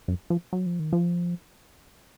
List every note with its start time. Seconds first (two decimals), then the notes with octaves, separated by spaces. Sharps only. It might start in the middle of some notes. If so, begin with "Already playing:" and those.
0.08 F#2
0.30 F3
0.53 F#3
0.66 F3
0.80 D#3
0.93 F3